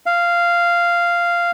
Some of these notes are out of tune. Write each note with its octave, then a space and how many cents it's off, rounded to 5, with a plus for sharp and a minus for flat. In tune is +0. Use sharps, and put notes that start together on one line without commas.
F5 -10